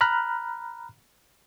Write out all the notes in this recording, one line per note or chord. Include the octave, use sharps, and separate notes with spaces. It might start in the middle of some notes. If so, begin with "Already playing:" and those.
A#5 B5 F6 F#6